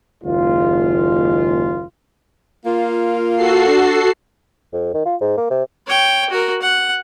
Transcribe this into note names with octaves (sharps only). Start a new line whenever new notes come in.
F#1 D#2 G#3 F4
A#3 F4
F#4 A4 C7
D4
F2
D#3
F4
G#2
A#3
C3
C#5 G5
F#4 A#4
F#5